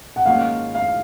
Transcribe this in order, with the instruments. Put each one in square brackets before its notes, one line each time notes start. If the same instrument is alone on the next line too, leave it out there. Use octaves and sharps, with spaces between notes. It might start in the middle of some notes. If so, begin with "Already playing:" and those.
[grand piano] F#5
[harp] G#2 D#3 A#3 C#4 F4 [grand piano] F5
[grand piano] F5